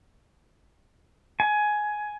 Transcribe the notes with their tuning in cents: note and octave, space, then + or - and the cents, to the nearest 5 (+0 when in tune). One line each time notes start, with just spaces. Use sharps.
G#5 +15